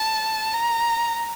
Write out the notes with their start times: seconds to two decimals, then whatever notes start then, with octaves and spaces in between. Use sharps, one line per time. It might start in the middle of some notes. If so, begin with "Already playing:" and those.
Already playing: A5
0.54 A#5